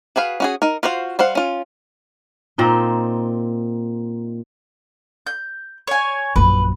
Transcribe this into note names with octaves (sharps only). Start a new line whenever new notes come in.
F#4 G#4 B4 F5
C#4 F#4 G#4
D#4 A#4
F4 F#4 C5 F5
G3 C5 F5 F#5
C#4 F4
A#2 C4 D#4
G6
C#5 G#5
A#1 F#2 B4